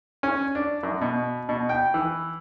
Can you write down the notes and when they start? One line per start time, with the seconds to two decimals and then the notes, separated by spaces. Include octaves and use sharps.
0.23 C#4
0.55 D4
0.83 F#2
1.01 B2
1.49 B2
1.69 G5
1.94 E3